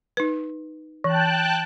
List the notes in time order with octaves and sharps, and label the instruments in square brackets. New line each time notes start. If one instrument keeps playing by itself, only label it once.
[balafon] D#4 B4
[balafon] E3 [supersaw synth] G5 A5 F#6